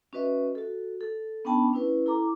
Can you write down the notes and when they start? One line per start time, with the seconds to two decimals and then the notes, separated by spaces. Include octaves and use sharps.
0.13 C#4 F#4 B4 D#5 E5
0.55 F#4 A4
1.01 A4
1.45 B3 C#4 D4 G5 A5 B5
1.73 C#4 E4 B4
2.06 E4 A4 A#5 D6